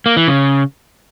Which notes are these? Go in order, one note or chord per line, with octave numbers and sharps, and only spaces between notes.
A#3
E3
C#3